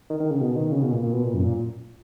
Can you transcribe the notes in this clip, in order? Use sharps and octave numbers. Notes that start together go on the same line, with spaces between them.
D#3
D#3
C#3
B2
D#3
C#3
B2
A#2
A#2
B2
A#2
F#2
A#2